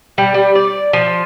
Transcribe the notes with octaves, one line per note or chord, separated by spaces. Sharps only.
G3
G3
D5
F3